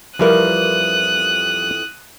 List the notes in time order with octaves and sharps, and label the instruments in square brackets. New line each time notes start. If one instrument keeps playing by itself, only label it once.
[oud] F2 E3 A#4 [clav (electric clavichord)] F3 G3 E4 [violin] D#6 F#6